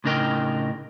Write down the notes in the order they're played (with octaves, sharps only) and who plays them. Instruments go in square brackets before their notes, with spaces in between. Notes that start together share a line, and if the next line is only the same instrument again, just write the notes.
[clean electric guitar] A2 C#3 D4 D#4 A#4 G5